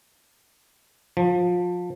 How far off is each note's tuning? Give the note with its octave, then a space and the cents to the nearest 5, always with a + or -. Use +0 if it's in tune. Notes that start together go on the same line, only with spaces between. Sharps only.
F3 +25